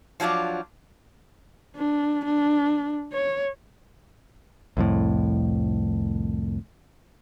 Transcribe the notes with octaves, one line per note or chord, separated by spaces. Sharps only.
F3 F#3 D4 E4 F4
D4
D4
C#5
C2 F2 A2